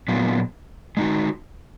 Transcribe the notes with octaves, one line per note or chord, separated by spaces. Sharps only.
A#2 F#3 B3 F4
G#3 D#4 F#4